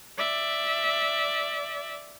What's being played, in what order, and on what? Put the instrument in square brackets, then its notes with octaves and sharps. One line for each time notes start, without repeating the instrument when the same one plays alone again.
[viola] D5 E5